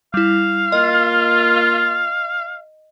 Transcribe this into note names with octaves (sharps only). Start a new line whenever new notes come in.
G3 E4 F5
A#3 F4 D#5